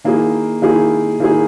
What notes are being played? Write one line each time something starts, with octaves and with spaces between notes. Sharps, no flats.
D#3 A#3 E4 G#4
D#3 A#3 E4 G#4
D#3 A#3 E4 G#4